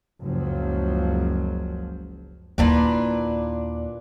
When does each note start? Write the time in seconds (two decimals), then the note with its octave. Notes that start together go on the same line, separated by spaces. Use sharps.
0.22 F#1 C#2 F3 F#3
2.58 D#2 A#2 D4 E4 B4